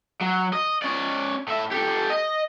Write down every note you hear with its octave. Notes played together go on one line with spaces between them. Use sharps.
F#3
D#5
C#4 D5
A2 E5
G4 A4
D#5